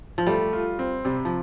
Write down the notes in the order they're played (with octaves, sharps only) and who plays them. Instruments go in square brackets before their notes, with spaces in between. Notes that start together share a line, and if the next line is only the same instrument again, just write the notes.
[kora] F3
[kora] G3 [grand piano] A3
[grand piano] F4
C4
[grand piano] C3 [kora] G3
[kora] F3